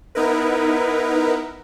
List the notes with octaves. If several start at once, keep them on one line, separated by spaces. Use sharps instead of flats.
B3 D#4 E4 A#4 B4